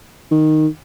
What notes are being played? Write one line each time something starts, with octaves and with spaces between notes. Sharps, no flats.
D#3